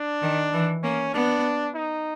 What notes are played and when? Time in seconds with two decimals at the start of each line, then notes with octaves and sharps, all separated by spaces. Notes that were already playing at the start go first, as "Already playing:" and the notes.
Already playing: D4
0.22 D#3
0.53 E3
0.83 A#3 C#4
1.14 B3 D4
1.75 D#4